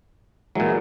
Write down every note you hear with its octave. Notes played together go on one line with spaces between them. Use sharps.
A#2 E3 F#3 G#3